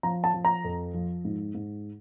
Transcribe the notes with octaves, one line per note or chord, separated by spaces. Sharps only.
F3 A#5
A5
F3
A#5
F2
F3
G#2
G#2